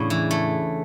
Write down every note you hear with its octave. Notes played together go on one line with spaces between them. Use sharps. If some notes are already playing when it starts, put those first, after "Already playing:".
Already playing: E2 A2 C#3 D4
E3
A3